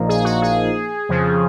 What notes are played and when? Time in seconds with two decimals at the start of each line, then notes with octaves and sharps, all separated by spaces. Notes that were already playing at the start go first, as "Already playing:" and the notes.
Already playing: A#1 A#2 F3 A#3 D#4
0.09 G#4
0.25 F#4
0.42 G#4
1.09 F2 C#3 F3